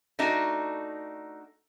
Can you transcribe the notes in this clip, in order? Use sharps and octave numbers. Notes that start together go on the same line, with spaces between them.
A3 D4 D#4 F#4